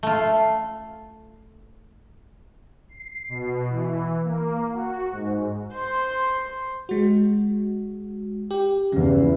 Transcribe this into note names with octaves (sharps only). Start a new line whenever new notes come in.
A3 F4
C7
B2
E3
A#3
F#4
G#2
C5 C6
G#3 F#4
G4
E2 C#3 G3
E4